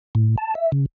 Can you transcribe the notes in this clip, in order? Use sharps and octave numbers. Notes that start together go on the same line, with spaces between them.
A2
A5
E5
C#3